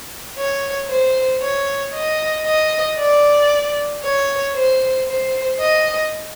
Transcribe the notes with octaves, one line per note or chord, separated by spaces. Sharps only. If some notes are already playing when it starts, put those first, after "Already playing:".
C#5
C5
C#5
D#5
D#5
D5
C#5
C5
C5
D#5